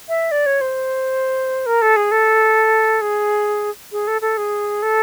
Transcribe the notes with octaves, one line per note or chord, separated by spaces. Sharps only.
E5
D5
C#5
C5
A#4
A4
G#4
A4
G#4
G#4
A4
A4
G#4
A4